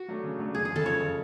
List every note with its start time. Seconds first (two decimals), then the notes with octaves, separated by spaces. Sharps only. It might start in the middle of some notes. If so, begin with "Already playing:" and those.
Already playing: F#4
0.08 F#3 A3 D4
0.23 C#3
0.39 F#3 A3 D4
0.55 F#1 G#4
0.65 G#4
0.71 F2 C#3 A4
0.85 F#1 C#5
1.02 C#3